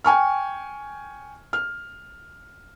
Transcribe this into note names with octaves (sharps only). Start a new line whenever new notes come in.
G5 G#5 C#6 F6
F6